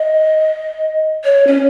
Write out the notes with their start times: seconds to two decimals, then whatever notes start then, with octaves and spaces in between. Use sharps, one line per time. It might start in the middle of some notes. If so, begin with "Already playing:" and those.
Already playing: D#5
1.24 C#5
1.47 C#4